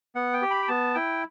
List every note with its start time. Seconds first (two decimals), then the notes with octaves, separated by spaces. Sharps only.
0.15 B3 F#5
0.33 G5
0.42 G4
0.51 B5
0.62 G5
0.68 B3 A5
0.95 E4 G5